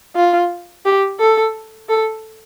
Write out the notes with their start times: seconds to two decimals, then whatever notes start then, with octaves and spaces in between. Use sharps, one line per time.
0.16 F4
0.85 G4
1.19 A4
1.89 A4